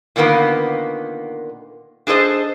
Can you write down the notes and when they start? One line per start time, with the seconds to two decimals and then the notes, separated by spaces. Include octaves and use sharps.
0.16 A#2 D3 D#3 A#3 B3
2.07 D4 G#4 A4 C5 D#5